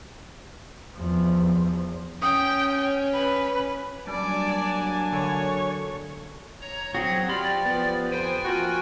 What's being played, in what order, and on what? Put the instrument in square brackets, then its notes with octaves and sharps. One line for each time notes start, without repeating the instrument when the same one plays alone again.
[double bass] E2 F3
[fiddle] C#4 [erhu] G5 [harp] D#6
[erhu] B4
[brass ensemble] F#3 A#3 D4 [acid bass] G3 [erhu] D5 [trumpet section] G#5 A5
[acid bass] D3 [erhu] C#5
[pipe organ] C#5 A#5
[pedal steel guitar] F#3 C4 F#4 [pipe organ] G#4 G#6
[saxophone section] F4 [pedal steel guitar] G4 B5 [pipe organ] D5
[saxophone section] F3 B3
[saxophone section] F2 B3 C5 [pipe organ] G5 G#5
[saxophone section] F3 A#3 F#4